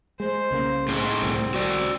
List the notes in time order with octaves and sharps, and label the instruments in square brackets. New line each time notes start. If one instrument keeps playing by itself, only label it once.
[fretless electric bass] G#3 [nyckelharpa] C5
[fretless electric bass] C2 C#3 A#3
[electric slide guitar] A2 G#4 C5 [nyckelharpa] C4
[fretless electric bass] D1 G1 C2
[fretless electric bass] C2 [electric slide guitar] F#4 D5